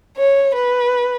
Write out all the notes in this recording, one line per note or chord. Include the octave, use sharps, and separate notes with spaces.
C#5
B4